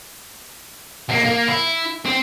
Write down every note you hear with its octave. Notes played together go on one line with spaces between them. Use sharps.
B1 A#3
A#3
E4
C4